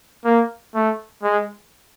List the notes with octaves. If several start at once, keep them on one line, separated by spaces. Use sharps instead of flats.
A#3
A3
G#3